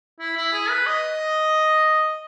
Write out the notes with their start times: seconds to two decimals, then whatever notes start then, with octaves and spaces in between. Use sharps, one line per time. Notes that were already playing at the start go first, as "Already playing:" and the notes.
0.20 E4
0.36 E4
0.53 G#4
0.70 B4
0.86 D#5